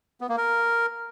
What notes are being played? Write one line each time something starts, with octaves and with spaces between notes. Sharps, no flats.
B3
A#3
A#4